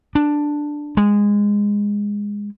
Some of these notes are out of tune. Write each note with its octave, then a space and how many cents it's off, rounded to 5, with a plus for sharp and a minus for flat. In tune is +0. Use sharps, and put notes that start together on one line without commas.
D4 +5
G#3 -15